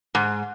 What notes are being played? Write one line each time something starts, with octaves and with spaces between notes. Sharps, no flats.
G#2